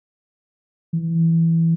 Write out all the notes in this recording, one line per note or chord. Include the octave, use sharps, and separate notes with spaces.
E3